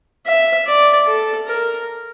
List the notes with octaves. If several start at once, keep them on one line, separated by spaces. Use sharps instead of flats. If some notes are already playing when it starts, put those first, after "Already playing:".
E5
D5
A4
A#4